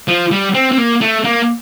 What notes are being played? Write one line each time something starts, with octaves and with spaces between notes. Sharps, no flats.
F3
G3
C4
C4
A#3
A3
A#3